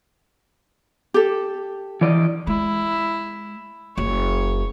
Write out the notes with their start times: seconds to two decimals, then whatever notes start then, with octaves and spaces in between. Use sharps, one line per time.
1.14 G4 A4
2.01 E3 D5 D#5
2.47 G#3 E4
3.97 F#1 C#5